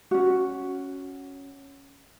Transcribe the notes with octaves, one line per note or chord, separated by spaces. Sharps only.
C#4 F#4